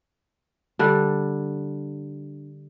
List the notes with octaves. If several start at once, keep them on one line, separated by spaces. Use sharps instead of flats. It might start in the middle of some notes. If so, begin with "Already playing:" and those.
D3 G3 D4